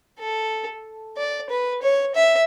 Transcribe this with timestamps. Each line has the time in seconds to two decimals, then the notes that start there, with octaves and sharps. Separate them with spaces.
0.19 A4
1.17 D5
1.50 B4
1.82 C#5
2.15 E5